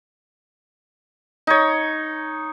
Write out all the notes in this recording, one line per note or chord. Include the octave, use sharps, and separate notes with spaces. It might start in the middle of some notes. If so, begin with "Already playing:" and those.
D#4 C#5